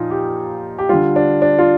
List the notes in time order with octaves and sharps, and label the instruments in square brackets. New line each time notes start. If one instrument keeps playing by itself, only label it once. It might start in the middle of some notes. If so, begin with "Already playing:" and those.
Already playing: [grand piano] A#2 F3 D#4 F4
G4
G4
D3 G3 F4
D4
D4
F4